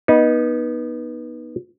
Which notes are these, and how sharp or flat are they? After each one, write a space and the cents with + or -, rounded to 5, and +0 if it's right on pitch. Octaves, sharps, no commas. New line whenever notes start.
B3 -25 D#4 +0